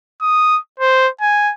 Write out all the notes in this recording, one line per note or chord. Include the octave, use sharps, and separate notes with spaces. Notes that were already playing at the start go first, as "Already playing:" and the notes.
D#6
C5
G#5